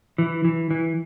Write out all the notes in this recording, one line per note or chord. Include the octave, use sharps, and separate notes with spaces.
E3
E3
E3